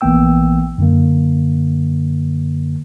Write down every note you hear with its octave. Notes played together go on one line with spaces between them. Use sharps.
A#1 E3 A#3 B3 G5 E6
F#2 D3 A#3